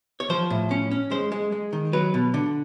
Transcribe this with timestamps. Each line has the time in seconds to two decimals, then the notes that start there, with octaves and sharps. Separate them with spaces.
0.20 C#5
0.30 F3 C5
0.50 A2
0.71 C#4
0.91 C#4
1.11 G#3 C5
1.32 G#3
1.52 G#3
1.73 D#3
1.93 F#3 B4
2.14 B2
2.34 D3